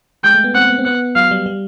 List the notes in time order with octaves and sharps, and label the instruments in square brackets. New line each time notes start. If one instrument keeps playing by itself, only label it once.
[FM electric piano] G#3 [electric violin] G5
[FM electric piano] A3
B3
[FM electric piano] C4 [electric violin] F#5
[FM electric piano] B3
C4
[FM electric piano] B3 [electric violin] F#5
[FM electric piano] F#3 [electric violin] F5
[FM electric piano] G3
G3